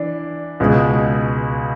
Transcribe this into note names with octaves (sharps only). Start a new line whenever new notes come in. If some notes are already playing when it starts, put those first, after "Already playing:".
Already playing: E3 D4
C#2 B2 G#3